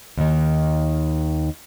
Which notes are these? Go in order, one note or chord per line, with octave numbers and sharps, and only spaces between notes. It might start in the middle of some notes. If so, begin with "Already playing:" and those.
D#2 D#3